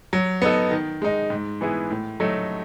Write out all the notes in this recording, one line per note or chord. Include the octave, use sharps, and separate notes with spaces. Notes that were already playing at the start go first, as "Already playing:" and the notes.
F#3
B3 D#4 A4
D#3
G#3 D#4
G#2
E3 B3 E4 G#4
A2
F#3 A3 D#4 A4